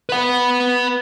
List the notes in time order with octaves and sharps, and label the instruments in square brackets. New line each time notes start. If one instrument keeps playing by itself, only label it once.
[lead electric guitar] B4 F#5